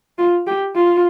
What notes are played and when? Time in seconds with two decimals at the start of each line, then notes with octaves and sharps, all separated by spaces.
0.18 F4
0.47 G4
0.75 F4